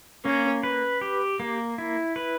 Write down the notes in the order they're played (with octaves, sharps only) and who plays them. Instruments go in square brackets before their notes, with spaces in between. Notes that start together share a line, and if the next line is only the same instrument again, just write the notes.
[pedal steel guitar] A#3 [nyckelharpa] C#4
[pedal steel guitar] B4
G4
A#3
E4
B4